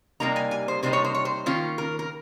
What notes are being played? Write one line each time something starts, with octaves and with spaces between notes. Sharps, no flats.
C3 G3 A#3 D#4 A#5
G#5
G#5
C5
C3 G3 A#3 D#4 C5
C#5
C5
C#5
C5
D#3 A#3 C#4 F4
A#4
A#4